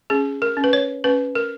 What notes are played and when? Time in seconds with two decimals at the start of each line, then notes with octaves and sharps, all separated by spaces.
0.10 C#4 G#4
0.42 A#4
0.57 C#4
0.64 B4
0.73 C#5
1.04 C#4 B4
1.35 A#4